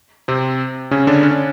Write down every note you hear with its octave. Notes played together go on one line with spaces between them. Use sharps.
C3 C4
C#3 C#4
D3 D4
C#4
D4